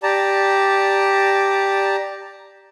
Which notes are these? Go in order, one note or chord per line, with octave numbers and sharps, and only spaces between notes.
G4 D5 A5 A#5